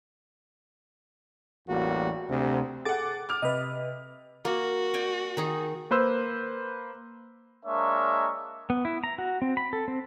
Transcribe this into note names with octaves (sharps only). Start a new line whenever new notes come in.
A1 E2 G3 A#3 F#4
D2 C3
G#4 A4 F#5 D6 A6
D6 F6
C3 B4 D#5
A#3 F#4
D5 G5 G#5
D#3 D#4 G#4
A#3 B4 C5 E6
G#3 A#3 D4 A#4 C#5 E5
B3
E4
A#5
F#4
C4
B5
A4
C4